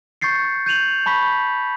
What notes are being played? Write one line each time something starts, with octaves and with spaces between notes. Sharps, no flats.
C#6 G6 A6 C7 C#7
G6 D#7 F7 F#7
A5 B5 C#6 B6